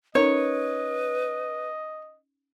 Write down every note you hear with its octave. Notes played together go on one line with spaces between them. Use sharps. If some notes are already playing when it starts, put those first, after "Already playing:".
C#4 D#4 A#4 B4 C#5 D#5